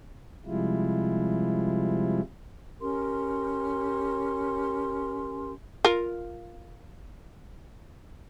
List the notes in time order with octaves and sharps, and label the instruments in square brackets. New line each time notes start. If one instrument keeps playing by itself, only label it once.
[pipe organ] C3 F3 G3 G#3 E4 F4
[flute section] C#4 G4 A#4 C6
[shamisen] F4 A#4